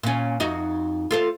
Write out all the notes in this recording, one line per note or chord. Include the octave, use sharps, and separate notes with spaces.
A#2 C#4
F2 D#4 F#4
F4 A4 C5